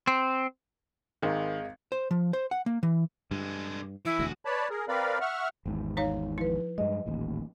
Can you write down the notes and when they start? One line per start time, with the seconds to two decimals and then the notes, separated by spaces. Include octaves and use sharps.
0.07 C4
1.22 G#1 D#3 G#3
1.92 C5
2.11 F3
2.33 C5
2.51 F#5
2.66 A#3
2.83 E3
3.31 G2 D3 G#3
4.05 E3 E4
4.19 E1 D2 F#4 G#4
4.45 B4 C#5 D5 A5 B5
4.70 G#4 A#4
4.88 C4 A#4 B4 D5 F5 B5
5.21 E5 F#5 C#6 F6
5.66 G#1 E2 G#2
5.97 D#4 C#5 F5
6.38 F3 E4 B4
6.78 G2 G#3 D#5
7.06 D#1 A1 D#2